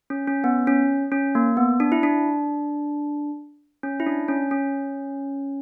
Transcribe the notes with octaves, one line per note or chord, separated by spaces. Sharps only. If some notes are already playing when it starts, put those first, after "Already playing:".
C#4
C#4
B3
C#4
C#4
A#3
B3
D4
E4
D4
C#4
E4
D4
C#4
C#4